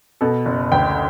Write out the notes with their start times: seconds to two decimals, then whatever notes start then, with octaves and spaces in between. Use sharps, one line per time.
0.21 B2 A4
0.45 F#1
0.72 D2 G5